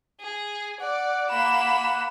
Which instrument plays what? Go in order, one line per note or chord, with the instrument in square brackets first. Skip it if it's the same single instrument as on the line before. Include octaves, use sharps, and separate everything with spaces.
[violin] G#4
[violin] D5 [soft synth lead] F#5
[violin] A#3 E7 [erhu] B5